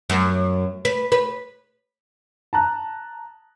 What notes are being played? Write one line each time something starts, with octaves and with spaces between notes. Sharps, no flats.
F#2
B4
B4
A5 A#5 F#6